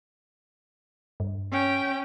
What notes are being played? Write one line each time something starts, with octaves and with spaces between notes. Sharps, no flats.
G2
C#4 G5